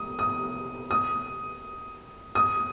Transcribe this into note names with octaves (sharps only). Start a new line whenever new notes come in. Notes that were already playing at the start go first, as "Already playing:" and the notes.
Already playing: D#6
D#6
D#6
D#6